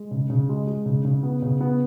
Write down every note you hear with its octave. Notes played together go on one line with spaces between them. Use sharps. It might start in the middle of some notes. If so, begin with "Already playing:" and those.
Already playing: G#3
C#3
C#3
G#3
G#3
C#3
C#3
B3
C#3
B3